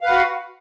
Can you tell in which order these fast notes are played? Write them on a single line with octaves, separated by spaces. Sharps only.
F5 B4 F#5 F#4